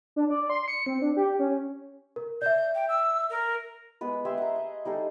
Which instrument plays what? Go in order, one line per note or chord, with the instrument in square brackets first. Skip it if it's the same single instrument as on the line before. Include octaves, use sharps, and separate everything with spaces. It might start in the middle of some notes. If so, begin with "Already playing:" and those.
[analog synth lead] D4
D5
C6
C#7
C4
D4
G4
C#4
[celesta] A#4
[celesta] D5 E5 [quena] G6
[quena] G5
E6
A#4
[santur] G#3 B3 B4
G4 G#4 E5 C6
F#5 A#5
D#5
G3 D#4 G#4 A4